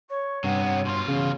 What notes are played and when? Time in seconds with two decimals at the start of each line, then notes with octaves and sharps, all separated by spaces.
0.10 C#5 C#6
0.44 G2 C3 B3 F#5
0.85 B2 F4 C6
1.08 C#3 E3 C#4 F5